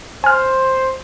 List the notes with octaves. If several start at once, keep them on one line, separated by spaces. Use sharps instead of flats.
C5 G#5 F6